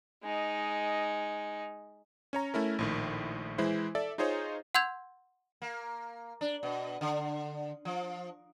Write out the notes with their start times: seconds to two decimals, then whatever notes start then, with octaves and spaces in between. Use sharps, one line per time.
0.23 G#3 D#4
2.33 C#4 C#5 A#5
2.54 A3 C#4 E4 A#4
2.79 A#1 A2 D#3
3.58 E3 G#3 E4 C5
3.95 A4 D5 E5
4.18 D#4 F4 G#4 C5 C#5 D#5
4.75 F#5 C6 E6 G6 G#6 F7
5.62 A#3
6.41 D4
6.63 B2
7.01 D3
7.85 F3